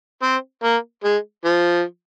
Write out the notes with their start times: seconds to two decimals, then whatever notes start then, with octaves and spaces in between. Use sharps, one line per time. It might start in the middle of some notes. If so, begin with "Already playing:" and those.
0.23 C4
0.63 A#3
1.04 G#3
1.45 F3